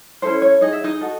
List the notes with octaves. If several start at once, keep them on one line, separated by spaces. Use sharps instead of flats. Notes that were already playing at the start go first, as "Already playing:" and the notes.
C#4 E4 A4 C5
C#5
D#4 G#4 D#5
E5
D#4 D#5
F#4 A4